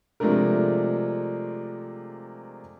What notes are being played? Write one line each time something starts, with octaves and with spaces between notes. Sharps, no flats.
C3 F3 G#3 A3 D4 A#4